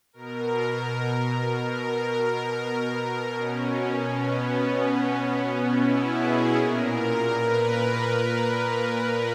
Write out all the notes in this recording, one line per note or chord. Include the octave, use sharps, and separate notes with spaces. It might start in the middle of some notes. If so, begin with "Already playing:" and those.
B2 A#4
A#4
B2 C#4
B3
E4
G#4
A#2 A#4
A#4
B4